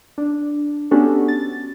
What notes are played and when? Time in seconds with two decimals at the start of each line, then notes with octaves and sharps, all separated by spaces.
0.18 D4
0.91 B3 C#4 D4 F#4 G4 A4
1.28 A6